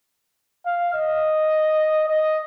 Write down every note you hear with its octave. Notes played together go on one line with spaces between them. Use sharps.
F5
D#5
D#5